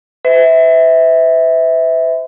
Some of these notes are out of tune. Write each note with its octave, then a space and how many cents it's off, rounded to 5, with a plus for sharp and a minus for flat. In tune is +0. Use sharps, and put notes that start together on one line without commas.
B4 +45 E5 -20